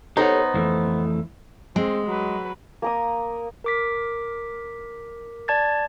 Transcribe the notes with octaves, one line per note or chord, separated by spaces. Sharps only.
B3 D#4 G4 A4 C5 C#5
F2 E3 A3
G#3 C4
F#3 B4
A#3 A#4 D#6
A#4 D6 B6
D5 A5 G#6 A6